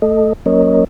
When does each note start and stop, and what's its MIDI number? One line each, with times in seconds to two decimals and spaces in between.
0.02 0.33 57
0.02 0.33 69
0.02 0.33 75
0.46 0.84 54
0.46 0.84 58
0.46 0.84 61
0.46 0.84 70
0.46 0.84 73
0.46 0.84 75